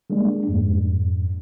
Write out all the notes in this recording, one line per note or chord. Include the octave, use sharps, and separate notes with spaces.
G3 G#3 A#3 D4
F2 G#2